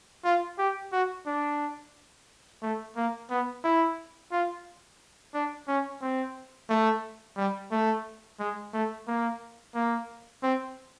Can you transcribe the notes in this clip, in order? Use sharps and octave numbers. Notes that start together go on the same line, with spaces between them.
F4
G4
F#4
D4
A3
A#3
B3
E4
F4
D4
C#4
C4
A3
G3
A3
G#3
A3
A#3
A#3
C4